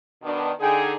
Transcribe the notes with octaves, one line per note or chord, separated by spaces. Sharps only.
B2 D#3 D4
D3 D#4 G#4 G5 G#5